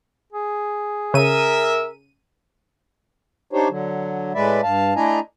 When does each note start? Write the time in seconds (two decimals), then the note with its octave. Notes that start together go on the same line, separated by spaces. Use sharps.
0.33 G#4
1.14 C#3 A#4 E5 D#7
3.53 D4 D#4 G4 C5 C#5
3.69 D3 F#3
4.34 A2 G#3 B4 D5 E5
4.63 G2 F5 A5
4.96 A3 D4 E4 D#5 G#5 A#5